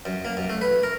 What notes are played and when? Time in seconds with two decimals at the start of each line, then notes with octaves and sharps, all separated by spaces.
0.05 F#2
0.25 A#3
0.37 F#2
0.49 A3
0.61 B4
0.83 A#4